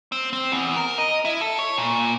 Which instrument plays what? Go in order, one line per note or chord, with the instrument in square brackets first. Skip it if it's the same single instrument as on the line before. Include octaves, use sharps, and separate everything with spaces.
[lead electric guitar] C4
C4
E2
A#4
D#5
E4
A4
C#5
A#2